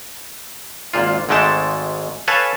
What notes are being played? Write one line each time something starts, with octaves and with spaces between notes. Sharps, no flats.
G#1 A#2 F4
G#1 G#2 G#3 A3 G5 A5
A4 B4 C#5 F5 G#5 A5